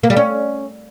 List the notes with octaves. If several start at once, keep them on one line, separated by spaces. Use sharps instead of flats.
A#3
G3
C#4